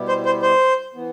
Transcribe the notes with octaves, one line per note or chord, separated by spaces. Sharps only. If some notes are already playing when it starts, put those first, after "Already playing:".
Already playing: B2 G3 B3 E4 G4
C5
C5
C5
E3 B3